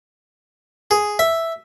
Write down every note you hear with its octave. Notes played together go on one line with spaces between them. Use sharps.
G#4
E5